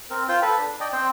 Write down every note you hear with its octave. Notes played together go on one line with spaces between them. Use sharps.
C4 A#4
F4 C5 G5
A4 B4
D4
D5 D#5 G5
C4 C5 G5